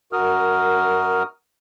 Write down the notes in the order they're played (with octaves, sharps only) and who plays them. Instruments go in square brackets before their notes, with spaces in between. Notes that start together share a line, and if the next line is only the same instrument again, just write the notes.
[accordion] F#2 F#4 A#4 D#6 F6